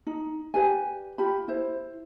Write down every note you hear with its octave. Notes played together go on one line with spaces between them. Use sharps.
D#4
G4 B4 D5 G#5
F4 G4 G5 B5
E4 C5